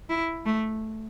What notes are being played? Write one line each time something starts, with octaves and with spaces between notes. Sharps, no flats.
E4
A3